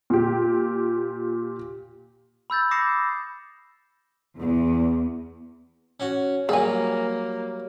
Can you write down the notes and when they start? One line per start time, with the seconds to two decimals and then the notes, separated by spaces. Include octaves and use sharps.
0.10 A#2 G4
2.50 B5 E6 G6 A6
2.71 D6 D#6 A#6 C7 C#7 E7
4.36 E2
6.00 C#4 F#4
6.49 F#3 G3 A#3 G#4 G#5